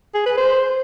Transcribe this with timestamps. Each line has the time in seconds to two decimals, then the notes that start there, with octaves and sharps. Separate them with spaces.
0.14 G#4
0.26 B4
0.38 C5